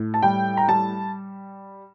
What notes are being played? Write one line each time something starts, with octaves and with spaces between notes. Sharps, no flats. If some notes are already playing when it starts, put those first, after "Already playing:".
Already playing: A2
A5
G3 G5
A#5
G3 A5